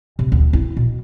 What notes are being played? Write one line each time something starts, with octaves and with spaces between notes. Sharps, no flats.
C3
D2
E4
B2